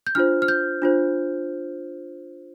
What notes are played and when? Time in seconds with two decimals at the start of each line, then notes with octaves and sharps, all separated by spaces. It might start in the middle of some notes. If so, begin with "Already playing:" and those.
0.07 G6
0.15 D4 F4 C5 F6
0.42 F6
0.48 G6
0.82 D4 F4 C5